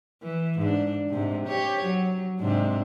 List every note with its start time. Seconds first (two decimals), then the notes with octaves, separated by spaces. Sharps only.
0.23 E3
0.59 G#2 D4
1.09 G#2 C3
1.46 G4 C#5
1.84 F#3
2.40 G#2 C3 D4